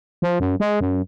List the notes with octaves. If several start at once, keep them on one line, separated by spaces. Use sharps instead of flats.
F3
F#2
G#3
F#2